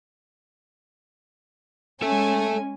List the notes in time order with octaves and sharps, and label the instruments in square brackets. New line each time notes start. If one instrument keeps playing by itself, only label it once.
[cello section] G#3 C#4 [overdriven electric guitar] A4 E5 [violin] G#5